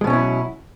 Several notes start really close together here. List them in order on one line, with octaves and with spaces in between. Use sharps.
G#3 B2 C#4 F#3 E4